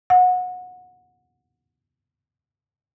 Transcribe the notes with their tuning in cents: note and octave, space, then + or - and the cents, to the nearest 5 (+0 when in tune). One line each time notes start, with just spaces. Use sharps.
F#5 -25